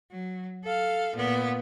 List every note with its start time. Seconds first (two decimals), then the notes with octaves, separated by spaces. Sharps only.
0.11 F#3
0.64 A4 F5
1.16 A#2 B3